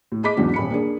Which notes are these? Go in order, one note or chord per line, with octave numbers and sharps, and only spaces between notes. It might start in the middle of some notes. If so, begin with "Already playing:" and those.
A2
G#4 D#5 B5 D6 B6
E2 G#2 E3 F#3 C#4 D4
D#1 B5 C#7
A#3 D4 G#4